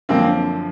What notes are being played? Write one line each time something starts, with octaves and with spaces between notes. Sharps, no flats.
F#2 D3 F3 A#3 C4